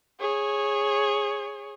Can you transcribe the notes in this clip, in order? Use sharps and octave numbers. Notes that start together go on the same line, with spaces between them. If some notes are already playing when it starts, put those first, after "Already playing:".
G#4 C#5